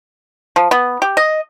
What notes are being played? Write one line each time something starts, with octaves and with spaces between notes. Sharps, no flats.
F3
B3
G4
D#5